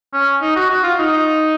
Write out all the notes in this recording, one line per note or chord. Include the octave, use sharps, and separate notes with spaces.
C#4
D#4
F#4
F#4
F4
D#4